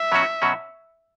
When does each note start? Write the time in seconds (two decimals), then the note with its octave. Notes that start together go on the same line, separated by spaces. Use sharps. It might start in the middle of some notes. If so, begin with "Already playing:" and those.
Already playing: E5
0.12 B2 F#3 C#4 F#4
0.42 B2 F#3 C#4 F#4